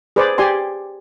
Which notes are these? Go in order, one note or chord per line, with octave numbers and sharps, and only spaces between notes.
G#4 B4 C5 D5
G4 D5 G#5 C6